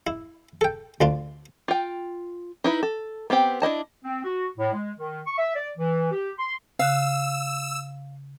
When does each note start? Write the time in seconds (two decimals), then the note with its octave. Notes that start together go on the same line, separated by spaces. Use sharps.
0.07 E4
0.61 A4 G5
1.01 D2 D4 F4
1.68 F4 G5
2.64 D#4 E4 B4
2.83 A4
3.30 B3 C4 G4 G5
3.62 D4 E4 D#5 A5
4.04 C4
4.24 F#4
4.59 A2
4.73 G#3
4.98 D#3
5.26 C#6
5.38 E5
5.56 D5
5.78 E3
6.12 G4
6.39 C6
6.79 C#3 F5 E6 F#6